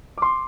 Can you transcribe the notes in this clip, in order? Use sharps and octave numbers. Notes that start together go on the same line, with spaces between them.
D6
C6